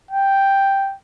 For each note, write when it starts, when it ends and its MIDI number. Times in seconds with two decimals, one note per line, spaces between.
0.11 0.94 79